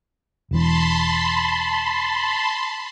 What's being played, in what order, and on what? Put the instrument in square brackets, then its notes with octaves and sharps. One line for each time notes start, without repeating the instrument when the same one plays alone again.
[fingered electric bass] E1 E3 [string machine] A5 B5 C6